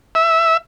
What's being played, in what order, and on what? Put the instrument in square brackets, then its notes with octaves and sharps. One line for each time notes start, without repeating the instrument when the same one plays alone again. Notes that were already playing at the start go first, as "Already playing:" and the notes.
[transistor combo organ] E5